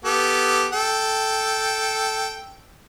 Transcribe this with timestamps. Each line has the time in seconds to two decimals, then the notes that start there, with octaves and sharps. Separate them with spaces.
0.05 B3 G4 A4
0.72 A4 G5